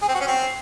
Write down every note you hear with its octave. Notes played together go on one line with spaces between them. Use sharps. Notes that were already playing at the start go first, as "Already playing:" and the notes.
G#4
C4
F#4
C#4
C4